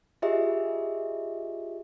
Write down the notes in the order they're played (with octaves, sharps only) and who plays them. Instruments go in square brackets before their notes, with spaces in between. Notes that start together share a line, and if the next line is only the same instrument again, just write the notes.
[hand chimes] F4 G4 G#4 D#5 E5